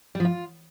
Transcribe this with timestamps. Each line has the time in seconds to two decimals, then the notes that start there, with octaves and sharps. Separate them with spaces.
0.15 G3
0.20 F3
0.25 F4